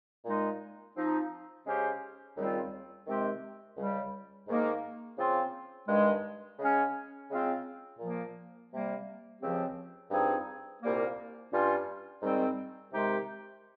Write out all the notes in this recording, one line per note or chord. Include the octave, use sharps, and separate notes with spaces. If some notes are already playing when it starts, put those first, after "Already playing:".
A#2 G#3 D#4
F3 C4 D#4
C#3 G#3 C#4 G4 C5
D#2 C#3 G3 C4 F4
C3 D#3 G#3 C4 G4
C#2 C#3 G3
G#2 D#3 A#3 D#4
C#3 F3 C4 F4
G2 D#3 G#3
C#3 G#3 C#4
C#3 G#3 C4 F4
A#2 F3 A#3
C3 G3 A#3
C#2 C#3 F3 C4 G4
G2 F3 C4 D#4 G#4
C2 A#2 G3 A#3
G2 G3 C#4 F4
G#2 D#3 G3 C4
C3 D#3 G#3 D#4 G4